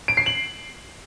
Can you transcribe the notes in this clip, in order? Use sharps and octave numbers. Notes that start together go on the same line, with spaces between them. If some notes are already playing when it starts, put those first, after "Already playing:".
D7
C7
F#7